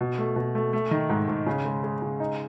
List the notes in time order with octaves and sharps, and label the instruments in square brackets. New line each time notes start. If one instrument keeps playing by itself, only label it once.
[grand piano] B2
A3
B2
A3
A3
D#3
G#2
G#2
C#3
G#3
G#3
C#3
D#4